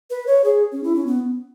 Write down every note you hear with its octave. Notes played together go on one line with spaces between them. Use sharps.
B4
C#5
G#4
C#4
E4
C#4
B3